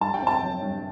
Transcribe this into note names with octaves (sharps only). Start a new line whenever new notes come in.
G2 A5
G5
C4 A5
F#3
G2